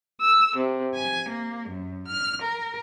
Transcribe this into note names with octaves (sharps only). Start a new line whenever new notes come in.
E6
C3
G#5
A#3
F#2
F6
A#4